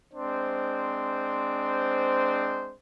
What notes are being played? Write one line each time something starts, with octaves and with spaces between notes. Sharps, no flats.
G#3 C4 D4 C5